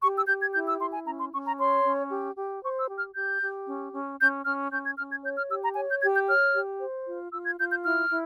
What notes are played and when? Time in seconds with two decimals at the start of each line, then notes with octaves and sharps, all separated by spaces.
0.02 G4 C#6
0.16 E6
0.28 G4 G6
0.41 G#6
0.54 E4 G6
0.68 E6
0.80 E4 C6
0.94 G#5
1.06 C#4 A#5
1.19 C6
1.32 C#4 C#6
1.46 A#5
1.59 C#5 C6
1.85 C#4
2.11 G4
2.37 G4
2.63 C5 C#6
2.80 E6
2.88 G4
2.97 F6
3.15 G4 G6
3.42 G4
3.67 C#4
3.93 C#4
4.20 C#4 G6
4.45 C#4 F6
4.72 C#4 G6
4.85 G#6
4.97 C#4 F6
5.11 G#6
5.23 C#5 G6
5.37 F6
5.50 G4 E6
5.63 A#5
5.75 C#5 G#5
5.89 G6
6.01 G4 G#6
6.14 G6
6.28 C#5 F6
6.54 G4
6.80 C5
7.07 F4
7.32 F4 E6
7.45 G#6
7.59 F4 G6
7.71 G6
7.84 E4 F6
8.10 E4